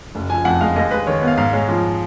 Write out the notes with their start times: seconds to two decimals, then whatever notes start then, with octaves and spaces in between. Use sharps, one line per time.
0.15 F#1
0.30 F3 G#5
0.45 F2 F#5
0.61 G#3 F5
0.76 D#2 D#5
0.91 G#3 B4
1.07 D#3 C#5
1.22 B3
1.27 F5
1.37 G#2 F5
1.53 G#3 C#5
1.69 F3